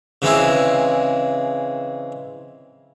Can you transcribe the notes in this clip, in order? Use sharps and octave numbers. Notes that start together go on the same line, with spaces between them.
C#3 E3 G#3 C4 E4